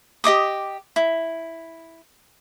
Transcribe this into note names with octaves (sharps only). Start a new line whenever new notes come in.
G4 D#5 D6 D#6
E4